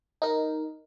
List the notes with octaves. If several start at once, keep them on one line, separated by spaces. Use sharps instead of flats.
D#4 A#4